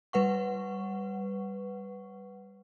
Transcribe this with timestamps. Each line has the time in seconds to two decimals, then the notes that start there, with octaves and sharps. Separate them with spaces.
0.13 G3 B4 F#5 C#6